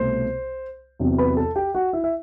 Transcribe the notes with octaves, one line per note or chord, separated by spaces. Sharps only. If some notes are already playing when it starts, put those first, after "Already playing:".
Already playing: C2 B2 A3 C5 C6
E2 C3 F#3 C4
B4 B5
A4 A5
G4 G5
F#4 F#5
E4 E5
E5